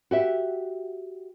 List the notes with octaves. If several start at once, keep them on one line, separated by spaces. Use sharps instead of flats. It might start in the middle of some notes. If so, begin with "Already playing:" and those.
F#4 G4 E5